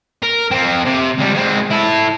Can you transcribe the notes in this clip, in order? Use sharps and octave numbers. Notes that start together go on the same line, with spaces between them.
A#4
F3 C4
C3
C#2 G3
G#3 C4
E4 A4